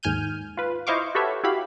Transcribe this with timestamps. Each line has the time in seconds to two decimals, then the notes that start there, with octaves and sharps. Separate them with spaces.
0.03 D#2 G#2 G#5 F6 G6 D#7
0.57 F4 B4
0.87 E4 C5 D#5 F5 C#6 D6
1.15 F#4 G4 A4 B4 C#5 E5
1.44 E4 F#4 G4 F5 B5